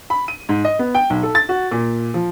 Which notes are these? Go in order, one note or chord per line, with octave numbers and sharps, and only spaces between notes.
B5
D#7
G#2
D#5
B3
G5
B1
A4
A6
F#4
A#2
F3